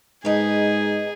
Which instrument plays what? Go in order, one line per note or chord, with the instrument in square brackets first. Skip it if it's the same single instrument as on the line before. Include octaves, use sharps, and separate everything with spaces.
[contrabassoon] G#2 [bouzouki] B3 D#4 [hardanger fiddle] G#4